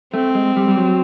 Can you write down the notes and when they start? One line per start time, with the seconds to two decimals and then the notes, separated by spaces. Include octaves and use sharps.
0.13 A3 C4
0.35 G#3
0.57 G3
0.68 G3
0.78 F#3